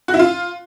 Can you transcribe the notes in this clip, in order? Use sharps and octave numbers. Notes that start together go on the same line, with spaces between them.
F#4
E4
F4